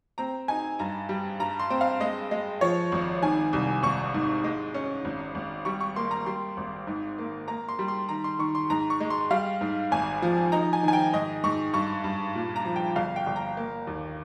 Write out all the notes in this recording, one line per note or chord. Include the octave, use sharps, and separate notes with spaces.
C4 A#5
D#4 G#5
G2 A#5
G3
G2 A#5
C6
C4
F5
G#3 D#5
G#3
F3 C#5
G#1
D#3 G#5
C2
G#1 C#6
G#2
G#3
C#4
G#1
G#1
G3 C#6
C#6
A#3 C6
A#5
G3 C6
G#1
G#2
A#3
A#3 A#5
C6
G3
C6
D#3 A#5
C6
D#3 C#6
C6
G#2 A#5
C#6
G#3
C6
G3 F5
G#2
G#1 G#5
F3
D#4 A#5
G#5
D#3
G#5
G5
G#2 D#5
G#2 C#6
G2 C#6
G2
A#2
A#5
F3
G5
G1 F5
G5
G1
A#5
A#3
D#2